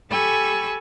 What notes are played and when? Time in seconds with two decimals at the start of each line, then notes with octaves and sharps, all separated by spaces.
0.11 G4 A4 G#5 B5 C#6 E6